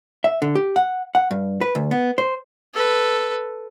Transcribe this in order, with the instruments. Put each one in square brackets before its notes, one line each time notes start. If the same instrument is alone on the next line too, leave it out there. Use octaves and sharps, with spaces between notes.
[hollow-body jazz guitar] E5
D3
G4
F#5
F#5
G2
B4
D2
B3
C5
[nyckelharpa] A4 B4